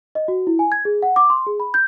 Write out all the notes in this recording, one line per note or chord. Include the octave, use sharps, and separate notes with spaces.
D#5
F#4
E4
G#5
G#6
G#4
F#5
D6
C6
G#4
B5
G6